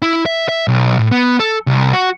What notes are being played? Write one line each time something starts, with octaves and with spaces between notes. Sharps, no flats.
E4
E5
E5
B1
A2
B3
A4
C2
F#4